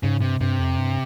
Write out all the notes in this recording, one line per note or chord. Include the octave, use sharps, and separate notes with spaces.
G#2 C#3
G2 C3
G2 C3
F2
G2